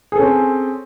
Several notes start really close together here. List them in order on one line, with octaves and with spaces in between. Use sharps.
G#4 A4 C#4 C4